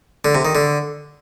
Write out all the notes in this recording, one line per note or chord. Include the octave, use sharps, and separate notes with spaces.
D3
C3
D#3
D3